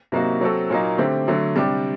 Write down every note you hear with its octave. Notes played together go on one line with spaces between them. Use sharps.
C3 F#3 A#3 D#4 F#4
F#3 C4 F#4 A4
A#2 F#3 A#3 D#4
D3 A3 C4 G4
D3 F#3 A3
C3 G3 D4 G4 D5